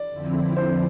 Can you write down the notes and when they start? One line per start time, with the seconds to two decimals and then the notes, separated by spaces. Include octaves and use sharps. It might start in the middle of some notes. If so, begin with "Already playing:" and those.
Already playing: D5
0.11 F2 D3 F3 C4 E4
0.57 C5